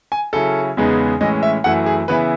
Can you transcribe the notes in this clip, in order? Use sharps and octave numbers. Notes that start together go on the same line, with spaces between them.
G#5
C#3 F#3 C#4 E4 A4
E2 C#3 G#3 B3 D#4
A2 E3 G#3 C#4 D#5
E5
F#2 E3 A3 E4 F#5
G#4
C#3 E3 B3 E4 B4